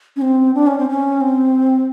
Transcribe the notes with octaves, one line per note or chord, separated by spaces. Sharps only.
C#4
C4
D4
C#4
C4
C#4
C4